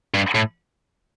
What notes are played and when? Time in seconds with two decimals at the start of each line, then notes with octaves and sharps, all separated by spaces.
0.14 G2
0.35 A2